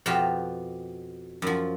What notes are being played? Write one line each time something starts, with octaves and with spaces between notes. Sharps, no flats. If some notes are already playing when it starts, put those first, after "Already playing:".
F2 B2 G4 F5 G5 A5
F#2 F3